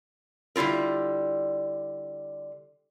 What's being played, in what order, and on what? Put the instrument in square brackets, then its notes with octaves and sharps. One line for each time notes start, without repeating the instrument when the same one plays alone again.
[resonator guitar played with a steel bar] D3 G3 E4 F4 A#4